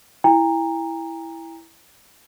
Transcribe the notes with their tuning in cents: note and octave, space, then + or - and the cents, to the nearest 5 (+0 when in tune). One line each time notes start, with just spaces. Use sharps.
E4 +0 G5 +45 A#5 +0